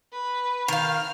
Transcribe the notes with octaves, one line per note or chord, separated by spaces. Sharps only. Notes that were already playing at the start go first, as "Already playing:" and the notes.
B4
D#3 F5 F6